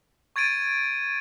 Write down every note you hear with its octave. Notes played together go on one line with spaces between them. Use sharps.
C#6 G#6 A6 D7 D#7